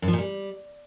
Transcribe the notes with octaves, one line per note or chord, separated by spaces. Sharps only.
F#2
F3
A#2
G3